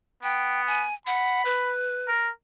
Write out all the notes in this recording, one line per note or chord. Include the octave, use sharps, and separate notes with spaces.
B3 G5
G#5
F#5 B5
B4
A#4